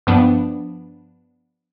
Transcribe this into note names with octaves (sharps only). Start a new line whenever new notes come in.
G2 F3 B3 D4